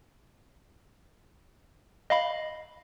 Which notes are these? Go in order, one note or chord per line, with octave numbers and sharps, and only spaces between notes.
D#5 F5 B5